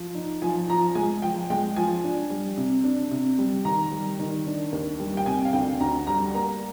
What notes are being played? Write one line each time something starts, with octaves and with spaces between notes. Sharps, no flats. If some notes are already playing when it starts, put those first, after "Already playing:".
Already playing: F3
D#4
F3 G#5
F3 A#5
G#3 G#5
F3 G5
G#3 G5
F3 G#5
D4
G3
C3
D4
C3
G3
D#3 A#5
G3
D#3
D4
D#2
G3
G5
C3 G#5
F5
D2 G5
D2 A#5
G3 A#5
A#3 A#5